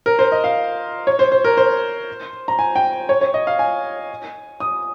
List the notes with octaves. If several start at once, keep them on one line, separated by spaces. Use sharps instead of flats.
A#4
C5
D#5
F5
C#5
C5
C5
A#4
C5
A#5
G#5
G5
C#5
C#5
D#5
F5
G#5
D#6